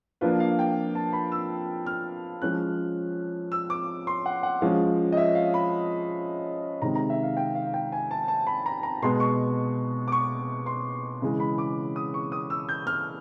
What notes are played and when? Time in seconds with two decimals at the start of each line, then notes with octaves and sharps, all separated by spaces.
0.21 F3 A#3 D4 F4 B4
0.40 F5
0.59 G5
0.95 A5
1.13 B5
1.32 E6
1.86 F6
2.42 F3 G#3 C#4 F#6
3.52 E6
3.70 D6
4.07 C6
4.26 F#5
4.43 F#5
4.61 F3 G#3 C#4 F5
5.13 D#5
5.17 E5
5.35 F5
5.54 B5
6.82 C3 D#3 G#3 A#5
6.95 A#5
7.10 E5
7.23 F5
7.37 G5
7.55 F5
7.74 G5
7.92 G#5
8.11 A5
8.28 A5
8.47 B5
8.66 A#5
8.83 A#5
9.02 B2 G#3 B3 C6
9.20 C#6
10.08 D6
10.12 C#6
10.66 C6
11.22 C#3 E3 G#3
11.40 B5
11.58 D6
11.96 D#6
12.14 C#6
12.32 D#6
12.50 E6
12.69 G6
12.87 F6